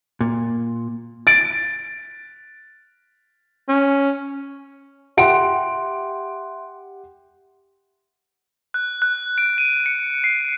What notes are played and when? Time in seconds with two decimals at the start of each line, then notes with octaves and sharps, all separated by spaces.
0.21 A#2
1.27 A6 D7
3.69 C#4
5.17 G4 E5 F#5 C6 D7
8.74 F#6
9.02 F#6
9.38 D7
9.58 D#7
9.86 C#7
10.24 C7